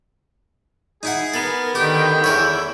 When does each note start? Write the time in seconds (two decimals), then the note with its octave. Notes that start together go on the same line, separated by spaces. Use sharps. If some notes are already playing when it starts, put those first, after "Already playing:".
1.03 D#4 E4 G#4 F#5
1.34 B3 A4 A#4
1.75 D3 D#3 G4 G5
2.24 E2 E4 A#4 C#5